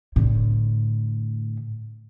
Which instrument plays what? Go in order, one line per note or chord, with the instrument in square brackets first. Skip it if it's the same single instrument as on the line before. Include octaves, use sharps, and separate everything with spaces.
[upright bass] A2 D3